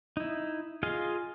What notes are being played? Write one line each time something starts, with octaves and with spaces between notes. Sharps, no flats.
D#4 E4
F4 G#4 D#5 F5